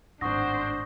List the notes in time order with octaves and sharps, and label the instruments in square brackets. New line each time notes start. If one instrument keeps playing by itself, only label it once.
[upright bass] G#1 A2 [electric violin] D4 C5 [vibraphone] F#5 [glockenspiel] C#6 D#6 A#6